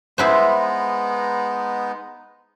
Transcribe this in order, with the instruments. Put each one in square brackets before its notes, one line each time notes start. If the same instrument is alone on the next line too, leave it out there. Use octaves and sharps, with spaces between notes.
[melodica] G#3 B3 D#4 [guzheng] E4 B4 C5